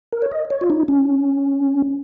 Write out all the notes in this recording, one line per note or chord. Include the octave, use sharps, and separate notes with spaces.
A#4
C#5
D#5
C#5
F4
D#4
C#4